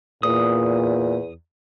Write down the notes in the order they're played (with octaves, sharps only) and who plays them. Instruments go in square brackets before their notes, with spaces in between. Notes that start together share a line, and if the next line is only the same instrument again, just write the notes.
[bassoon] E2 [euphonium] A#2 [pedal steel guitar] D#6